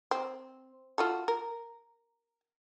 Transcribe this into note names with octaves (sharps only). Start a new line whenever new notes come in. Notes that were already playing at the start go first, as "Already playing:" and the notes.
C4
F4 F#4 A4
A#4